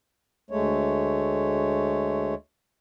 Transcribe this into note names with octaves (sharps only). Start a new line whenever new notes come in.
D2 G#3 A3 C#5